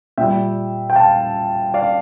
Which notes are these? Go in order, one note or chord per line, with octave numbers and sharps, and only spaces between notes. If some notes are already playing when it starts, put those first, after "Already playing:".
A#2 G3 E5 G5
G5
F5 A5
D5 F5